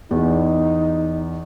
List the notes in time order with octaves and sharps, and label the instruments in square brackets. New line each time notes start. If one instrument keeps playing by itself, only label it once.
[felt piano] E2 [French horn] D#4